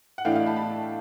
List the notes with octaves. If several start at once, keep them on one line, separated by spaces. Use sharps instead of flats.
F#5
A2 E3 A3 D4 F5 G5
D#5 F5
A5 B5
A5 B5